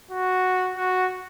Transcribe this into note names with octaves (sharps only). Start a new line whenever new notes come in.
F#4
F#4